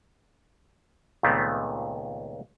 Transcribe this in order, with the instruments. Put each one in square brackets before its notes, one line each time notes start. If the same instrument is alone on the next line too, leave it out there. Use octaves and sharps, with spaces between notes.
[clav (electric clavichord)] C#2 A#2 D#3 A3 B3 C4